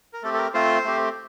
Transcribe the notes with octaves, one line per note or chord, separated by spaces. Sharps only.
A#4
A3 C4 G4 A4
A4
A#4
A3 C4 F4 C5
A3 C4 G4